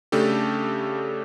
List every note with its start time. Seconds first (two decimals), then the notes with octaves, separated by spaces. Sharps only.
0.12 C#3 A3 D4 G4 A4